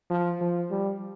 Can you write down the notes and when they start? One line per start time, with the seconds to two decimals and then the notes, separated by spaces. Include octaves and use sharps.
0.10 F3
0.41 F3
0.71 G3